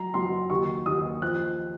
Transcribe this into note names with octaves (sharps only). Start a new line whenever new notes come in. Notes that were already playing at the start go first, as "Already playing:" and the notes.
Already playing: F#3 A#5
F#3 C6
D#2 C#6
D#2 D#6
F3 F#6